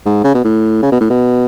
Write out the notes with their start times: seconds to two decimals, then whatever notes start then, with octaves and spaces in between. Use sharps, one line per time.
0.06 G#2
0.24 C#3
0.34 B2
0.44 A2
0.82 C#3
0.92 B2
1.01 A2
1.10 B2